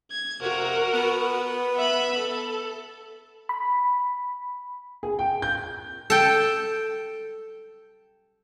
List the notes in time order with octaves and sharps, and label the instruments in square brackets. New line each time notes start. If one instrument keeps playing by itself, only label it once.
[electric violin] G#6
[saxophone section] F2 C3 [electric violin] F#4 A#4
[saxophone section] B3
[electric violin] E5 B5
A4
[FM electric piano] B5
[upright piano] G#4
G5
G6
[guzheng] A4 G5